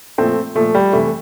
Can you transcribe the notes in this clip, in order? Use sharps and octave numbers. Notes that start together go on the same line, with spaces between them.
A#2 F3 A3 C4
A#2 F3 A3
G3
C3 E3 A3